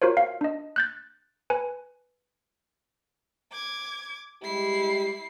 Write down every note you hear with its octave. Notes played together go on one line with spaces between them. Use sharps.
F4 F#4 A#4 C5 C#5
F5
D4 D#5
F#6 G6 A6
B4 G#5
D6 G#6
G3 G#3 E4 G4 C7